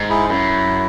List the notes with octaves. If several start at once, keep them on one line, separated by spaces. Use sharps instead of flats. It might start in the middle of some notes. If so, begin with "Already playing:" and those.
Already playing: G#2
E4 G#4
F#2 E4